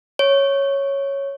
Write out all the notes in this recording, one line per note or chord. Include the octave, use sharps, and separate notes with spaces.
C#5